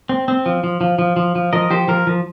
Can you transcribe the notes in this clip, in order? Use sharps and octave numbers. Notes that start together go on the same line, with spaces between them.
C4
C4
F3
F3
F3
F3
F3
F3
F3 A#4 D#5
F3 G4 C5
F3 A#4
F3